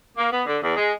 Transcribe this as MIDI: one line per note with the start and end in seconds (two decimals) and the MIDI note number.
0.17 0.29 58
0.32 0.41 59
0.46 0.58 50
0.63 0.74 40
0.76 0.92 56